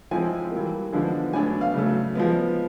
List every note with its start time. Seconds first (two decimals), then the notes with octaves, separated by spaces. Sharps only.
0.11 F3 G#3 C4 E4 G#5
0.51 E3 G3 A#3
0.93 D3 F3 G#3 B3 D4
1.33 A2 F#3 B3 D4 G#5
1.61 F5
1.74 C#3 F#3 A3
2.15 F3 G#3 B3